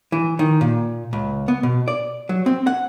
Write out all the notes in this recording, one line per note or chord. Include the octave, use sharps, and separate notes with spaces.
E3
D#3
A#2
C#2
B3
B2
D5
F#3
C4
F#5